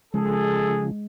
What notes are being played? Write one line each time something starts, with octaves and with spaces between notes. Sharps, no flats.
C#3 F3 G#3 G#4 A4